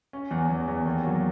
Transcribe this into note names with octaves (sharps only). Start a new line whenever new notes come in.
C#4
E2
E2
E2
D#2
F#3